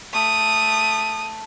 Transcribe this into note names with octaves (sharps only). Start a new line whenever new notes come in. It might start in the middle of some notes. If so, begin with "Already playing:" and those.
A3 D#6